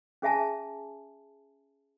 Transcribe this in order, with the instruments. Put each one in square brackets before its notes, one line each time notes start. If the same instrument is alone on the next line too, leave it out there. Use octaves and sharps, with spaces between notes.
[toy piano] C#4 G#4 E5 G#5 A5